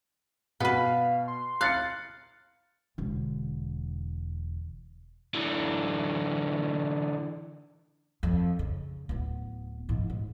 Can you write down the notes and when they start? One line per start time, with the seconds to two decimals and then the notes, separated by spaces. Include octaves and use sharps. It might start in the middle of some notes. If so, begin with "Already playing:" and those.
0.60 B2 B3 B4 F5
1.28 C6
1.61 F5 F#6 A6 C#7
2.98 E1 D3
5.34 D3 E3
8.23 F2
8.59 C#3
9.09 D1 B3
9.89 G#2 F3
10.10 G#2